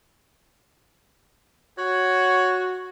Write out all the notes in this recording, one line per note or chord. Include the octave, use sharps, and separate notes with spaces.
F#4 C#5